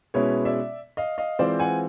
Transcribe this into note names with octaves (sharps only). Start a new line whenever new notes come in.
B2 G#3 C#4 E4 B4 C#5
D5 E5
D#5 F5
D#5 F5
E3 G#3 C4 F4 C5 D5
F#5 G#5